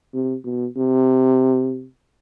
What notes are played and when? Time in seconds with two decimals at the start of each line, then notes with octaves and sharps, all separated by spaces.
0.13 C3
0.44 B2
0.76 C3